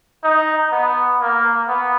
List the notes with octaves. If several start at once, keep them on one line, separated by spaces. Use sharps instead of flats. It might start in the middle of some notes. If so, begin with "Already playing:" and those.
D#4
B3
A#3
B3